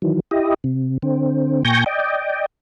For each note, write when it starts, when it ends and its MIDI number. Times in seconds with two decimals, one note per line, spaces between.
0.02 0.20 51
0.02 0.20 52
0.02 0.20 54
0.31 0.54 64
0.31 0.54 67
0.31 0.54 75
0.64 0.98 48
1.02 1.63 50
1.02 1.63 60
1.65 1.84 46
1.65 1.84 79
1.65 1.84 80
1.65 1.84 85
1.65 1.84 91
1.65 1.84 94
1.86 2.46 74
1.86 2.46 75
1.86 2.46 79